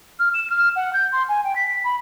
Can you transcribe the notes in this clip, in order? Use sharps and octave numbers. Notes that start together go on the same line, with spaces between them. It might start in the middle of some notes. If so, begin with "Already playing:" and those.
F6
E7
F6
F#5
G6
C6
G#5
G5
B6
B5